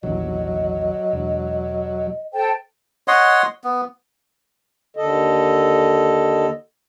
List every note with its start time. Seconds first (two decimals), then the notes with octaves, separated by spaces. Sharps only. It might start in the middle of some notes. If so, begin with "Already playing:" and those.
0.03 A#1 E2 D#3 F#3 D#5
1.13 E1
2.33 A4 C5 G5 A5
3.08 C#5 D#5 F#5 C6
3.64 B3
4.97 D#2 D3 A4 D#5